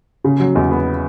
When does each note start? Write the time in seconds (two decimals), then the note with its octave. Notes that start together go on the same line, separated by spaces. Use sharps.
0.24 C#3
0.40 F#3
0.55 E2
0.71 B3